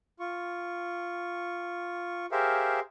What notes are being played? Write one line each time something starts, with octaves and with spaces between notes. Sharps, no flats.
F4 C#6
G4 G#4 A#4 C5 E5 F5